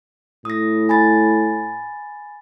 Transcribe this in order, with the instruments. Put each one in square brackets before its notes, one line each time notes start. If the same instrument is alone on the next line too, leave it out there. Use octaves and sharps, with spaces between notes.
[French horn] A2 [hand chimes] D#6 A#6
[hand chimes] G#5 B5 A6